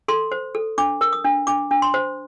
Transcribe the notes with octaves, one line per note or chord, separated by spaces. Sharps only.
A4 C6
C5
A4
D4 D6
A#4
D#6
D4
D4 D6
D4
C6
C5